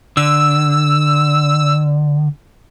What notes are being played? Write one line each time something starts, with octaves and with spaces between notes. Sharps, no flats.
D3 E6